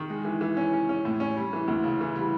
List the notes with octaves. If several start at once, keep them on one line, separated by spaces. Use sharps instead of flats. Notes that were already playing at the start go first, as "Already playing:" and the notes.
Already playing: D#3
G#3
E3
E3
C#4
C#4
C#4
A2
C#4
G3
E3
D2
C#3
E3
G3